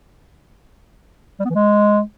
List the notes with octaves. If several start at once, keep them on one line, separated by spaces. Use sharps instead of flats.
G3
B3
E3
G#3